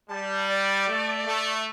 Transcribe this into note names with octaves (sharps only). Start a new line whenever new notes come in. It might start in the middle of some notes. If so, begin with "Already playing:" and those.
G3 A5
D5
A3
A3